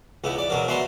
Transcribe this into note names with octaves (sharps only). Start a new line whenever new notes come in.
C#2 B3 E4
D5
B2 F#3 A#4
B3 F#4 E5 A#5 C6